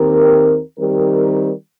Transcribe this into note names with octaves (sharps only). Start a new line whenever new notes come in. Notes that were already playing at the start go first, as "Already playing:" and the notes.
Already playing: D#2 D#3 C4 G4 A#4
D#3 G3 C4 G4 A#4